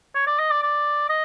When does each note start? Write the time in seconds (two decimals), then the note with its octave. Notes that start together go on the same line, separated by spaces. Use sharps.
0.15 C#5
0.27 D5
0.39 D#5
0.51 D5
0.62 D5
1.09 D#5